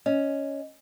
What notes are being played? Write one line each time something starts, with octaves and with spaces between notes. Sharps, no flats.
C#4 D#5